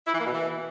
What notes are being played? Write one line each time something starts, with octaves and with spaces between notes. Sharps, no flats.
E4
E3
A#3
B2
E3